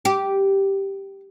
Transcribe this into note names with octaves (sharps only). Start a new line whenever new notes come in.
G4